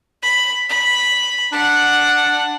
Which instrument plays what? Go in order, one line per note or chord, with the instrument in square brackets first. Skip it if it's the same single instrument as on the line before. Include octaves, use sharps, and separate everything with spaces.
[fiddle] B5
B5
[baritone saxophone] D4 [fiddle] F#5